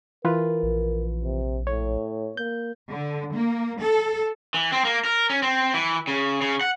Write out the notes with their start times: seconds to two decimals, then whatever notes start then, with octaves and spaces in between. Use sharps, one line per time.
0.25 E3 F4 A#4 B4
0.63 A#1
1.24 C3
1.67 A2 C#5
2.37 A#3 G6
2.91 D3
3.34 A#3
3.80 A4
4.54 E3
4.72 C4
4.85 A#3
5.05 A#4
5.30 C#4
5.42 C4
5.74 E3
6.07 C#3
6.41 C#3
6.61 F#5